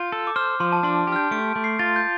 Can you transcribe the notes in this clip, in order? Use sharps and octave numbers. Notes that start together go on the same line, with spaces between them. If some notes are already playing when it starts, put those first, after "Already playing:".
Already playing: F4 G6
A4
D6
C5 F6
F3 C6
A5
D4 C6
G4 F6
G6
A3 D7
A3
C7
F4 A6
G6